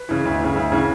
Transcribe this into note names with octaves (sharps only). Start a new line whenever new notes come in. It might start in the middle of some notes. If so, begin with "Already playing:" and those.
Already playing: B4
C#3 E3
D2
C#3 E3
D2
C#3 E3